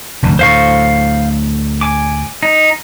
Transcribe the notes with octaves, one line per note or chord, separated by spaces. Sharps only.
F1 D2 G2
D2 A2 C5 F5 C#6
G#5 D6
D#4